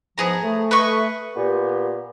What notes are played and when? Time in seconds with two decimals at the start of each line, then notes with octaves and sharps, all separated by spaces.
0.18 E2 G#2 F3 B3 G#4 A#5
0.43 A3
0.71 B4 D#5 C#6
1.36 A#2 B3 G4